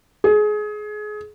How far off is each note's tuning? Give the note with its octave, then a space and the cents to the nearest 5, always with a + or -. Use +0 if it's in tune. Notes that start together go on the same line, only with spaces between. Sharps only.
G#4 +25